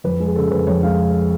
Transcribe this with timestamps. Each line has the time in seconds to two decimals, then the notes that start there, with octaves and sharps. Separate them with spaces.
0.04 F2 B4
0.20 G#3
0.26 G#4
0.35 C#3 A4
0.51 F2 B4
0.67 F2 C#5
0.83 G#3 F5